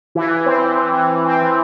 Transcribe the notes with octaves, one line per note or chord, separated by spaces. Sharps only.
E3
E3
C4
E3
E3
E3
E3
C4
E3